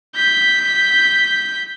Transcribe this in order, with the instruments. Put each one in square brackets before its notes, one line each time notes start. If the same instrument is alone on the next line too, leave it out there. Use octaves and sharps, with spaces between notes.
[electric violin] G6 B6